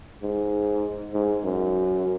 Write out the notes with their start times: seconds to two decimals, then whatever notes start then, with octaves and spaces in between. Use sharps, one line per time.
0.23 G#2
1.14 G#2
1.44 F#2